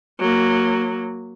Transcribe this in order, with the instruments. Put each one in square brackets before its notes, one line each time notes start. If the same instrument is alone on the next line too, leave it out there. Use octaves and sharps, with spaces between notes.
[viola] F#3 A#3